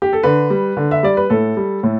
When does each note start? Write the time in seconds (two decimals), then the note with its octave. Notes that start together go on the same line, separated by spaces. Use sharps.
0.02 G4
0.13 A4
0.23 D3 B4
0.50 G3
0.77 D3
0.91 E5
1.03 G3 D5
1.17 B4
1.30 A2 A4
1.57 G3
1.83 A2